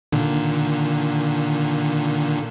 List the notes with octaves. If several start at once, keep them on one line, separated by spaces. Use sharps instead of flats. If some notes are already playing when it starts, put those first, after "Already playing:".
A#2 D3 D#3